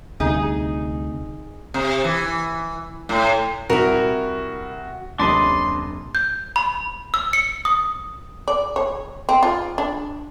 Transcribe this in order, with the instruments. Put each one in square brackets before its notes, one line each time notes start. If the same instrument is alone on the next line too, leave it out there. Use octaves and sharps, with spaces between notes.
[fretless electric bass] D2 C3 G3 [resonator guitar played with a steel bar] D#4 G#4
[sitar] C3
E3
A2
[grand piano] C2 [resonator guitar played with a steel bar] E4 A#4 [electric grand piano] F#4
[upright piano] D#1 F#2 C3 [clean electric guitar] D4 B4 D#5 [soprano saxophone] C6
[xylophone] G6
B5
E6
C#7
D#6
[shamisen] D5
C#5
C4
F4
D4